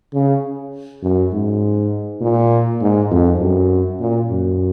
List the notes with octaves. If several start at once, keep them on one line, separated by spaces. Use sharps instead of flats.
C#3
F#2
G#2
A#2
G#2
F2
F#2
A#2
F#2